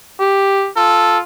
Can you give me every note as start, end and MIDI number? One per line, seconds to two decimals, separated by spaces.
0.20 0.68 67
0.77 1.23 65
0.77 1.18 69